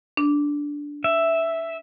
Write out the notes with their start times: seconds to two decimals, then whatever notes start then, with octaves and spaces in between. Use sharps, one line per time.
0.17 D4
1.04 E5